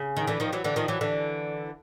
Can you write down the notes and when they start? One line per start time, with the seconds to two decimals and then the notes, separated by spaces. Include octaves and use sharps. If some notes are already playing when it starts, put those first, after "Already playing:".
Already playing: C#3
0.16 D#3
0.27 D3 E3
0.40 D#3 F3
0.53 E3 F#3
0.64 D3 E3
0.76 D#3 F3
0.88 E3 F#3
1.01 D3 E3